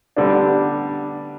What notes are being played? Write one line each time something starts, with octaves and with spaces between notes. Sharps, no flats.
D3 G3 B3 D4